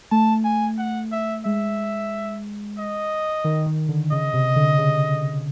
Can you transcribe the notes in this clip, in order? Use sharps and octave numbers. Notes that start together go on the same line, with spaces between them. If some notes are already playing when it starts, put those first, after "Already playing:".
A3 A5
G#5
F#5
E5
G#3 E5
D#5
D#3
D#3
D3
C#3 D#5
C3
D3
C#3